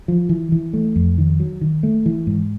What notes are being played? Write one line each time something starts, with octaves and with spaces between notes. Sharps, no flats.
F3
E3
E3
A3
F2
D#3
F#3
D#3
A3
E3
G#2